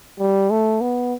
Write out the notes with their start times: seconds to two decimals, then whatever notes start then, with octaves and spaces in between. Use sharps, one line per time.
0.19 G3
0.51 A3
0.81 B3